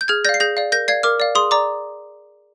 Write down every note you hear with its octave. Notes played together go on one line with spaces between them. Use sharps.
G6
G#4 F6 G#6
D5 F5 G6 A#6
C7
G#4 G6 A#6
D5 F5
A#4 G6 A#6
D5 F5 G#6 C7
A#4 D6 F6
D5 F5
G#4 C6 D#6
D5 A#5 D6